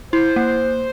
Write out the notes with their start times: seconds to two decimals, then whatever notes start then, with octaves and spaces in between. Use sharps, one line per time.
0.13 E4 C5
0.36 A#3